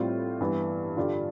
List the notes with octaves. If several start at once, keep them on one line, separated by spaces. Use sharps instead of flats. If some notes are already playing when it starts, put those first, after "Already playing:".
Already playing: A2 G3 C4 F4
G2 E3 B3
G2 D3 G3 D4 F4